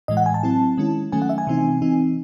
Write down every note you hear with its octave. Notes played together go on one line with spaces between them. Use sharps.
A2 E3 G#3 D#5
F#5
G#5
A5
F#3 C4 E4
D#3 G#3 C#4 E4
D#3 F#3 A3 C#4 G#5
F#5
E5
G#5
C3 E3 C4 D#4
E3 C4 D#4